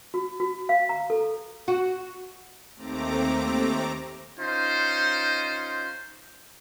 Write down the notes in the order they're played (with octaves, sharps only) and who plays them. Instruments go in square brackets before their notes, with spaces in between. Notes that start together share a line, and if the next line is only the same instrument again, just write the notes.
[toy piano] F#4
F#4
F5
A#5
A4
[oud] F#4
[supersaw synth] D#2 A3 C4 A#5 D6
[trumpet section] C#4 D#4 F4 C5